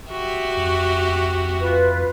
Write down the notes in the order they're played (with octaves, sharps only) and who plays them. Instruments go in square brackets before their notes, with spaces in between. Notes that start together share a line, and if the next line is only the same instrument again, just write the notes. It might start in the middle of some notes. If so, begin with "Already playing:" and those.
[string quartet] F#4 G4 E5
[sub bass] F2
[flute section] F4 B4